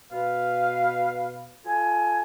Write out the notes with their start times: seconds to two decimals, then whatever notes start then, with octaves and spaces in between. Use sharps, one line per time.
0.12 B2 B4 F5
1.65 F4 A4 G#5